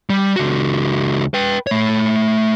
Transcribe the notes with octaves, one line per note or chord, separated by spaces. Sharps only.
G3
C#2 F#4
B4 G5
A3 C#5